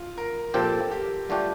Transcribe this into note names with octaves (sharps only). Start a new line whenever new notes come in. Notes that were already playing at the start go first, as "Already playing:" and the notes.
Already playing: F4
A#4
A#2 F3 C4 G4 A4
G4
G2 D3 A3 D4 F4 G4